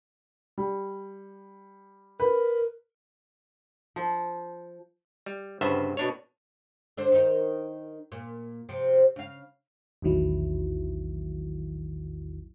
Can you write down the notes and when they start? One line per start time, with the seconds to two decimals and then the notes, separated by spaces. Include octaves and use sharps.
0.58 G3
2.20 A#4 B4
3.96 F3
5.26 G3
5.61 G1 G2 C#3 B3 C5 E5
5.97 B2 D4 C#5
6.97 D3 D4 C5
7.12 D#3 D#4 A#4
8.12 A#2
8.69 C3 F3 C4
9.16 C#3 F5
10.02 A#1 E2 A2 D#3 F#3 E4